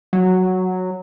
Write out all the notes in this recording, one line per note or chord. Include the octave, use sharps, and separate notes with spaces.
F#3